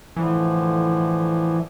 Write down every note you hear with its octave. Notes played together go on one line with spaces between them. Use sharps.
A2 D3 E3 F3